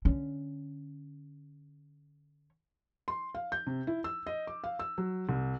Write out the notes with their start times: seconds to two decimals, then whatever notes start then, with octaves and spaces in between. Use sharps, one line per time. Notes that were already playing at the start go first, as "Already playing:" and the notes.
0.05 D3 C#4
3.08 C6
3.35 F5
3.52 G6
3.67 C3
3.87 E4
4.04 E6
4.27 D#5
4.47 D6
4.64 F5
4.79 E6
4.98 F#3
5.29 C2